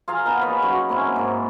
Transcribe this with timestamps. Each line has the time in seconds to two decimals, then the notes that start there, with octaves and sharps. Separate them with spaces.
0.08 F4 G#4 F5 A#5
0.25 B3 D#4 A#4
0.41 B4 C#5 D#5 B5
0.62 F#2 F#4
0.89 A#3 C4 C#4 E4
1.16 G#2 A#3